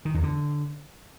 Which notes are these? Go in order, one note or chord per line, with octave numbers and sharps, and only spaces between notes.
D#3
E2
D3